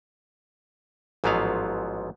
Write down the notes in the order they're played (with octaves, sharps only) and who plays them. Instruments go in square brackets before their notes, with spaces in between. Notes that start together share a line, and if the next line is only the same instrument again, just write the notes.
[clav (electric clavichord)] A1 G#2 F3 F#3 B3 F5